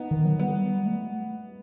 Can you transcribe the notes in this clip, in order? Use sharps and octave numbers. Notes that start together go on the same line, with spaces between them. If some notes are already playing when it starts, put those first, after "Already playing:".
Already playing: B3 D#4
D#3
F#3
G3 B3
A3